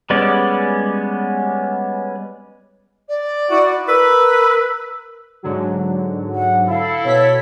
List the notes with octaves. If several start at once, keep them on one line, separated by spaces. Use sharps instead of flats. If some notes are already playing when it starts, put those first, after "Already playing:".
G3 G#3 B3 C#4 D5
D5
E4 F#4
A#4 B4 E6
G#2 D3 F#3
F#5
E4 A4 F5
B2 C#5 B6